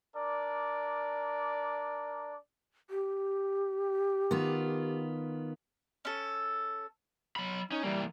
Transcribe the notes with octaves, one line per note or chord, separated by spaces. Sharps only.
D4 A#4 D5
G4
D#3 B3 F4
C#4 A4
F#3 B5
C#4 D#4
E3 G3 A#3